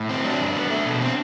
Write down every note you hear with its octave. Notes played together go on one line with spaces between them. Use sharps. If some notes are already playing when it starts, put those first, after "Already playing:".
Already playing: A2
C4
F#3 D4
F#2
B3
A3
B2
C4